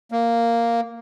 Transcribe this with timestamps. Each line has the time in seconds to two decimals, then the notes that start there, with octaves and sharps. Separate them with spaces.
0.12 A#3